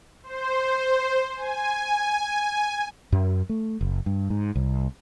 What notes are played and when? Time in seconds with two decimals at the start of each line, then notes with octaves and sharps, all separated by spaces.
0.23 C5
1.36 G#5
3.12 F#2
3.49 A3
3.81 F#1
4.06 G2
4.30 G#2
4.56 C2